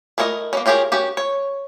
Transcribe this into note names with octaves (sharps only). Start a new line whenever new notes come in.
A3 E4 A#4 C#5 D#5
A#3 B3 C#4
C#4 F4 G4 G#4 A#4
C#4 F#4 G4
C#5